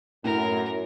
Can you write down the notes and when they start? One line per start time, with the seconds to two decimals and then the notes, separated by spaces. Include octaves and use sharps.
0.24 F#2 A2 A#4